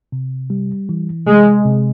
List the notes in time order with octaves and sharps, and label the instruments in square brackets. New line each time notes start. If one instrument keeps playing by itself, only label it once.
[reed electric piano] C3
G3
E3
[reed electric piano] C3 [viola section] G#3
[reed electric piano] C3